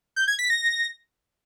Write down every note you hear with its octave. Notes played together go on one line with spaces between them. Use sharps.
G6
G#6
B6
A#6